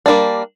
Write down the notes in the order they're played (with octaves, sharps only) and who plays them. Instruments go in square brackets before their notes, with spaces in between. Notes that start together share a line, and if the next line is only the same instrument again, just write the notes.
[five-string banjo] G3 A#3 D4